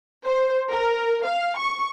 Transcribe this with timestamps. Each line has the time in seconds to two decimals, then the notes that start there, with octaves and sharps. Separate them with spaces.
0.25 C5
0.71 A#4
1.26 F5
1.59 C#6